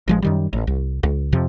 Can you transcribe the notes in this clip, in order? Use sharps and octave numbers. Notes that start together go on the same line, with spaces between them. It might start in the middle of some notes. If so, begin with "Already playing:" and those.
A1 F3 G#3
F#2 D#3 G3
A1
C2
C#2
F2 C3 F3